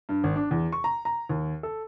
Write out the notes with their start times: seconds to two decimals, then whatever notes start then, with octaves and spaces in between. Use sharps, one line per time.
0.09 G2
0.24 G#1
0.36 D4
0.51 E2
0.72 C#6
0.84 A#5
1.05 A#5
1.29 D#2
1.63 A4